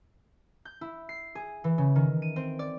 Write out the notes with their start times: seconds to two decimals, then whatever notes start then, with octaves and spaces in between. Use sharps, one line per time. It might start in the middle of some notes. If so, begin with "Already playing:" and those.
0.65 G6
0.81 E4
1.09 C7
1.35 G#4
1.64 E3
1.78 C#3
1.96 D#3
2.22 D#7
2.36 C4
2.59 D5